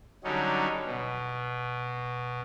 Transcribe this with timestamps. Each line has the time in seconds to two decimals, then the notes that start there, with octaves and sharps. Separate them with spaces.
0.24 D3 F#3 G3 C#4 D#4
0.85 B2